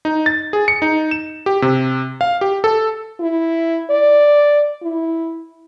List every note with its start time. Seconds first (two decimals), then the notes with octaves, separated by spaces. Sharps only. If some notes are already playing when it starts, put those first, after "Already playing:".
0.05 D#4
0.26 A6
0.53 G#4
0.68 C#7
0.82 D#4
1.11 E7
1.46 G4
1.62 C3
2.21 F5
2.41 G4
2.64 A4
3.20 E4
3.90 D5
4.83 E4